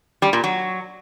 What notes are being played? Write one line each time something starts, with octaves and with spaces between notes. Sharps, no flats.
G3
A#2
F#3